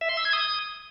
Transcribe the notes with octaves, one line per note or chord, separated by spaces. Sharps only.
E5
C6
E6
G#6
D#6